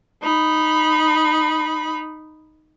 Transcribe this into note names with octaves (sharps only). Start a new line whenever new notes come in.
D#4 B5